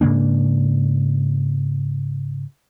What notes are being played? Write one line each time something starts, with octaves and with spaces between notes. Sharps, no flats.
G#2 C#3 A#3 D4